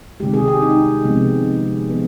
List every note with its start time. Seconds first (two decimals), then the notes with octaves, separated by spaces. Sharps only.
0.20 C3 D#3 G#3 G4
0.34 G#4
0.48 G4
0.62 D#4
1.04 C3 F3 G#3 B3
1.89 C3 F3 B3